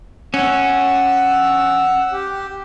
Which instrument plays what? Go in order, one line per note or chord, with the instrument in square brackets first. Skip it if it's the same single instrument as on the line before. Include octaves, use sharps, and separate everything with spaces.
[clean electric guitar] C#4 [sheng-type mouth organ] F#5 E6
[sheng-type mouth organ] G4